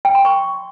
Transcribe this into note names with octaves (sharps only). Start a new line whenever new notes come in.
G5
C6
C#6